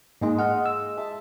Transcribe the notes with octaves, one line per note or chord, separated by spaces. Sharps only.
G#2 G#3 A#3 D#4 D#5
F4 D#5 F#5 F6
E6
E5 A5